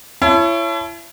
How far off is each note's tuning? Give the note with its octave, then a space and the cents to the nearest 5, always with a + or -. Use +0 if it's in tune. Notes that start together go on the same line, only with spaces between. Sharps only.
E4 +30 C#5 +0 A5 -20